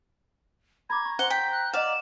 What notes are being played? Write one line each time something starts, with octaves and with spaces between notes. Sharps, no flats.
A#5 B5 D6 G#6
C#6
C5 F#5 G#5 C6 G7
G5 B6
F#6
D5 D#5 F5 F#5 E7